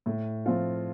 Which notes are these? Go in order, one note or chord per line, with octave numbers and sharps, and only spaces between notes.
A2
F3 C4 F4